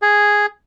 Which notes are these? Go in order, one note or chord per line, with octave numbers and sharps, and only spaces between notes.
G#4